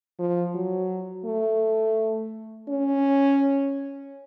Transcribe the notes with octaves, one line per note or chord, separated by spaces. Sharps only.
F3
F#3
A3
C#4